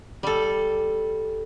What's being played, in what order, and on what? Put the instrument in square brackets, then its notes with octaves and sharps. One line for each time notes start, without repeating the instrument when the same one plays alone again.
[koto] G3 A4